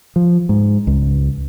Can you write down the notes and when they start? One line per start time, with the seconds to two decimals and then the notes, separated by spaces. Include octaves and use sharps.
0.16 F3
0.49 G#2
0.87 C#2